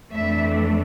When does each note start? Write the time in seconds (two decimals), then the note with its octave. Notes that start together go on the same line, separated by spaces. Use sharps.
0.11 F2 E3 A3 D4 E5